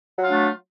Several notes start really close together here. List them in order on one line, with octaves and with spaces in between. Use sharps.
F#3 F4 D4 A3